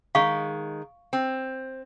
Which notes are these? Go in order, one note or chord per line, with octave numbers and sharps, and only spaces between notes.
D#3 G#3 F5 C#6
C4